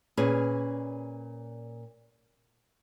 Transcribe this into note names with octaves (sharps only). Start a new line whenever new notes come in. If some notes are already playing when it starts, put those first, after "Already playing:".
A#2 C#4 G#4 B4